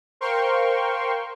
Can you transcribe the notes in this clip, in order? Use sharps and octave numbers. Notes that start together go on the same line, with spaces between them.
A#4 C5 F5 G5 C6 C#6